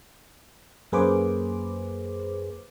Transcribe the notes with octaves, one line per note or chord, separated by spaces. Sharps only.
F#2 A#3 G#4 B4 C5 D6